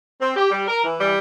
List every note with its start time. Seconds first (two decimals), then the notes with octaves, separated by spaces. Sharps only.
0.20 C4
0.36 G4
0.51 G3
0.67 A#4
0.83 E3
0.99 G3